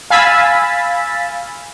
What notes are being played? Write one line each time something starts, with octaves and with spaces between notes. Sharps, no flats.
F5 G#5 B5 E6 A6 B6